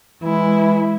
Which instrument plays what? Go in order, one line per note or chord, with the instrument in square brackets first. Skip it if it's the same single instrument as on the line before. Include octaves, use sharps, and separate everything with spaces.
[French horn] E3 [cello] G#3 E4